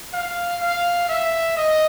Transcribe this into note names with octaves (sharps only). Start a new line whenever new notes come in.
F5
F5
E5
D#5